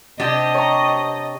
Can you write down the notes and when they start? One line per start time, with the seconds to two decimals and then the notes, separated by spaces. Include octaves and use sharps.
0.20 C3 D4 G4 D#5
0.54 C#5 A#5